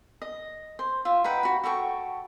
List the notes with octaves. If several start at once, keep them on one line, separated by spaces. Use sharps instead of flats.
D#5
C5
F4 E5
D#4 B4 F#5 G5
F#4 B5
F#4 A4 G5 C#6